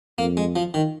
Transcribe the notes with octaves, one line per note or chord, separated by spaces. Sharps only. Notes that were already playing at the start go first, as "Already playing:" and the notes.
F2 A#3
G#3
F3
D#3